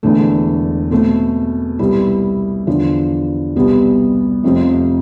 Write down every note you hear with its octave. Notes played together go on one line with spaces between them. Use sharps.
E1 E2 D3 A3
B2 A3 C4
C2 B2 G3 B3 E4
E2 D3 F3
C2 B2 G3 B3
F1 F2 C3 F3 C4